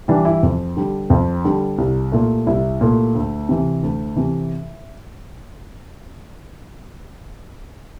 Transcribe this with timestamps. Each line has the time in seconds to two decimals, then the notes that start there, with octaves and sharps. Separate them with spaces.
0.08 E3 G3 D4
0.25 E4
0.43 F2
0.77 D3 G3
1.10 F2
1.44 D3 G3
1.78 C2
2.12 A#2 A3
2.46 C2 E4
2.81 A#2 A3
3.15 D2
3.49 C3 E3
3.83 D2
4.16 C3 E3